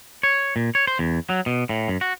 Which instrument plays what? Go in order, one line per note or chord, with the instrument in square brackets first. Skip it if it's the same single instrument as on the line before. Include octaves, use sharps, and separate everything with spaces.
[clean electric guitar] C#5
A#2
C#5
C5
E2
F#3
B2
A2
F#2
F#4